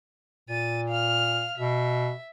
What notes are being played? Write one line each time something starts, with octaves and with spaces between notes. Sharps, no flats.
A#2 A6 D#7
F5 F6
B2 E5